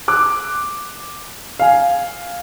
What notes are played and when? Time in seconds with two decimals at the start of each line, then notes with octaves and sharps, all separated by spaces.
0.08 D6 F#6
1.60 F5 G#5